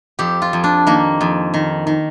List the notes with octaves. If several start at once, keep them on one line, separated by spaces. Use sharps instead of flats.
F2 G4
F4
F2
D4
D#3 A#3
F2
D#3
D#3